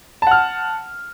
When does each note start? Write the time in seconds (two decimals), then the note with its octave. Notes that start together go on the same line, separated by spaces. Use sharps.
0.22 A5
0.27 F#5
0.31 F6